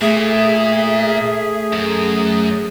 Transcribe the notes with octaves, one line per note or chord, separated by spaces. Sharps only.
A#2 A3 G#4 E5
F#2